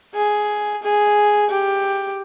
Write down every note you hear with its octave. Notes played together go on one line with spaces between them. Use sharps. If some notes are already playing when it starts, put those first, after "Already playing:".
G#4
G#4
G4